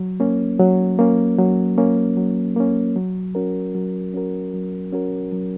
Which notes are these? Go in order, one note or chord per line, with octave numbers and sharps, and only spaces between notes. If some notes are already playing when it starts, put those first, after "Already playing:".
Already playing: F#3
A#3 C#4
F#3
A#3 C#4
F#3
A#3 C#4
F#3
A#3 C#4
F#3
C#4 F#4 A#4
F#3
C#4 F#4 A#4
F#3
C#4 F#4 A#4
F#3